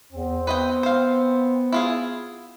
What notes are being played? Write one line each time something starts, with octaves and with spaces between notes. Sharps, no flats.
E2 C4
B3 B4 D#5 G5
C5 F5
E4 F4 G#4